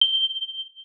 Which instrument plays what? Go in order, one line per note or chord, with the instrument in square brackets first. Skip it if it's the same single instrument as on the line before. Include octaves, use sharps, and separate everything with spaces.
[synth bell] G7